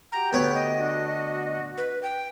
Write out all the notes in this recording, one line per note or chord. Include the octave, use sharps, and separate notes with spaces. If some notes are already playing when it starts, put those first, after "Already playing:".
F#4 G4 G5 A#5
D2 B3 B4 C#5
D#5
D4 F#4
B4
G5